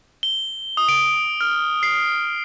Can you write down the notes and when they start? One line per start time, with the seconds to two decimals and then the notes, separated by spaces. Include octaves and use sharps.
0.23 G7
0.77 D#6
0.89 D7
1.41 F6
1.83 C7